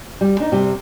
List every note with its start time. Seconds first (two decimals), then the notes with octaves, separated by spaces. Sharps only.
0.21 G3
0.40 D4 D#4
0.52 C3 G3